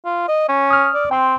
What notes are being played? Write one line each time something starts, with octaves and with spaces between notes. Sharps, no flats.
F4
D#5
C#4
D#6 F6
D5
C4 G5 C6